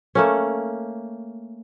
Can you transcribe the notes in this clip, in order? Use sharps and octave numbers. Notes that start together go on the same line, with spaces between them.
A3 A#3 C#4